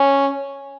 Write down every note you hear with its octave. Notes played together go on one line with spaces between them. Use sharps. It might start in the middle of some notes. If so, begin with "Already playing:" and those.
Already playing: C#4